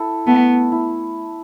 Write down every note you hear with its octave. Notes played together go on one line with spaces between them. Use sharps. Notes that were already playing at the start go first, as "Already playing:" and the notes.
Already playing: E4 A4
A3 B3
E4